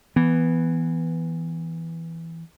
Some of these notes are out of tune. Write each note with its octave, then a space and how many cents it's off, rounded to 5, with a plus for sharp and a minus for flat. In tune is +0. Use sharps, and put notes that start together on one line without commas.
E3 +0 B3 +0